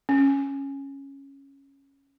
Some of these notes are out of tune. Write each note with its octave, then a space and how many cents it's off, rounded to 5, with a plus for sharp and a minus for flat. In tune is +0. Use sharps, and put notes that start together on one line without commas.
C#4 -10